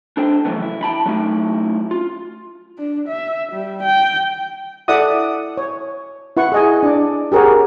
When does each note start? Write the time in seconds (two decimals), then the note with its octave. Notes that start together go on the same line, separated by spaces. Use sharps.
0.17 D4 A4 C5 G5
0.45 F2 C#3 E3 F#3 A3 B3
0.62 E4
0.83 G5 A5 B5
1.06 F#3 A3 C#4 D#4 E4 F#4
1.91 F4
2.78 D4
3.09 E5
3.52 G3
3.83 G5
4.88 E4 A4 D5 E5 F#5 D#6
5.57 C#5
6.37 E4 B4 F#5 C#6
6.52 G#4 D#5 G#5
6.83 D4 D5
7.32 G4 G#4 A#4 C#5 F#5